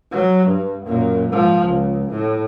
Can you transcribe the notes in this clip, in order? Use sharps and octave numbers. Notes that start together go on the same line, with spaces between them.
F#3
G2
F#2 A#2
G#2 F3
C#2
A2